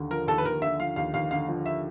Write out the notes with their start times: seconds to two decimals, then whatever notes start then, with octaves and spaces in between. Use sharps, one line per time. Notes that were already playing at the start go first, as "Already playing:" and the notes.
Already playing: D#2 D3
0.10 F3 A#4
0.27 D#2 A4
0.38 B4
0.45 D#2 A#4
0.62 D3 E5
0.80 F3 F5
0.96 D#2 F5
1.14 D#2 F5
1.31 D3 F5
1.48 F3
1.66 E5